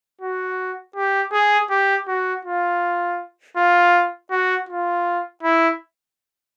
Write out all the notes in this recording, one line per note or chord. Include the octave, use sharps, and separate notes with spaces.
F#4
G4
G#4
G4
F#4
F4
F4
F#4
F4
E4